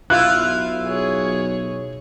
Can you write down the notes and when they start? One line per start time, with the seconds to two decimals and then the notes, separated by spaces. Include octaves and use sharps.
0.10 B1 E4 F4 F#6
0.86 G#4 C#5